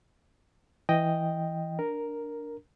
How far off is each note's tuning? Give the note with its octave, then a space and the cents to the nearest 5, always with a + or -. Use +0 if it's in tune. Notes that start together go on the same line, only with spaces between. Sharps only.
E3 +0 D#5 +0 G5 +0
D4 +0 A#4 +0